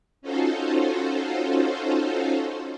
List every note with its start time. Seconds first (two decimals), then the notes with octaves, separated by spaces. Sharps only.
0.22 C#4 D#4 F4 F#4 A4 C5